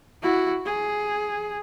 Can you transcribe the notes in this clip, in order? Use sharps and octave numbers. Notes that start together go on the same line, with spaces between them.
E4 F#4
G#4